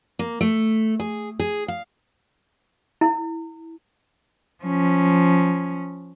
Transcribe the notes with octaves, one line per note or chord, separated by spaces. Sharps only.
A#3
A3
G#4
G#4
F5
E4
F3 C#4